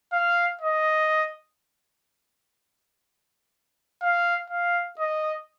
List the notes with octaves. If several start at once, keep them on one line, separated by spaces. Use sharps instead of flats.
F5
D#5
F5
F5
D#5